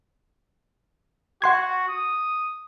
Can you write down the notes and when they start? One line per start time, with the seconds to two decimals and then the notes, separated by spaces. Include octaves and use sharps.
1.42 F#4 F#5 C6 G#6
1.88 D#6